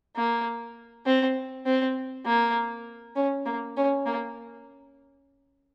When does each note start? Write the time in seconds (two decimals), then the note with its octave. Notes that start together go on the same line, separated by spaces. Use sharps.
0.16 A#3
1.06 C4
1.66 C4
2.26 A#3
3.16 C#4
3.46 A#3
3.77 C#4
4.06 A#3